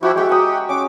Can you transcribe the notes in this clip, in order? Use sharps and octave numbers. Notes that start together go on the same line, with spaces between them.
F3 E4 F#4 G4
G#3 F#4 G4 E5
G4 F#5 A#5 D#6
C#4 C#6 D6